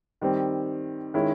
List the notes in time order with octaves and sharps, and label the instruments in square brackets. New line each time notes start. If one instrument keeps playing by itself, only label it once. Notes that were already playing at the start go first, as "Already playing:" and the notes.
[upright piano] D#3 G3 C4
D#3 G#3 C#4 E4